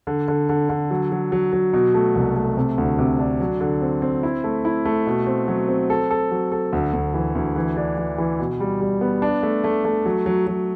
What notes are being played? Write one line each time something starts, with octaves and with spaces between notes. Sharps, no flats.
D3
D3
D3
D3
F#3
F#3
F#3
F#3
B2
A3
C2
A3
C3
D2
C3
D4
F#3
D3
C4
C4
E4
A3
E4
A3
B2
C4
F#3
C4
A4
A4
F#3
A4
D2
D2
E3
D2
E3
D4
E3
E3
B2
G3
G3
B3
D4
A3
A3
A3
F#3
F#3
F#3